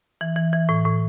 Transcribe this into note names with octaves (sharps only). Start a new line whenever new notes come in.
E3
E3
E3
A2
A2